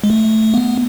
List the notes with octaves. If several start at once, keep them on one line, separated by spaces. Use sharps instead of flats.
G#3
A3
B3